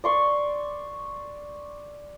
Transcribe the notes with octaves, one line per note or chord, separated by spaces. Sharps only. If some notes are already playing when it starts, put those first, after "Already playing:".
D5 C6 C#6